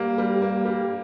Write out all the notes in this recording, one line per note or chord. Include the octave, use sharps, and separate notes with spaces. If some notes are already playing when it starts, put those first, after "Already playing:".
Already playing: G3 A#3
G3
A#3
G3